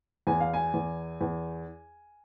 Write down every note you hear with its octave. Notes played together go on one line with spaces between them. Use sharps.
E2 G#5
F5
G#5
E2
E2